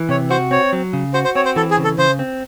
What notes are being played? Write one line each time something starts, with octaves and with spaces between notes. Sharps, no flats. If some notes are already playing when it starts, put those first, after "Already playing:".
Already playing: E3
C3 C#5
F#4 C5
C4 C#5
F#3
C#3
F#4 C5
C5
C4 C#5
C5
E3 A4
G#4
C#3
A4
C#3 C5
C4